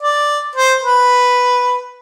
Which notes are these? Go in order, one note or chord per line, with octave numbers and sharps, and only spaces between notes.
D5
C5
B4